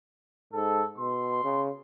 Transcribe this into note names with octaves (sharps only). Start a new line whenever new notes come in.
G#2 A4
B2 C6
C#3